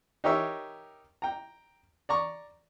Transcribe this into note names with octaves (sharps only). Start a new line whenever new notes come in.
D#4 G4 A#4 C#5 E5
G5 A#5
D5 A#5 C#6